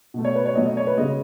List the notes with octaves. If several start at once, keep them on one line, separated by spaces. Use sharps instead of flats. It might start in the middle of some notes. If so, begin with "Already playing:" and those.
B2 A3
C#5
B4
C#5
B2 F#3 A3 D#5
D#5
C#5
B4
C#3 G#3 D#5